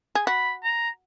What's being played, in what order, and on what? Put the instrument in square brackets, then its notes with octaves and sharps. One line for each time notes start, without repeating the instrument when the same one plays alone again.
[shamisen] G#4
[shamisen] F#4 [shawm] B5
[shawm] A#5